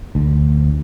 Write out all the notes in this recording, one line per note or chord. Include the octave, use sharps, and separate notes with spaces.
D2